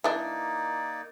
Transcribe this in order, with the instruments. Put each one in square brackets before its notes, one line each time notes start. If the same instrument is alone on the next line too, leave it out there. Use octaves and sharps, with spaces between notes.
[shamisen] E3 D4 [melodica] A#3 D#4 D5